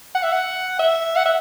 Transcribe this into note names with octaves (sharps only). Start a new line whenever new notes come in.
F#5
E5
F#5
E5
F#5
E5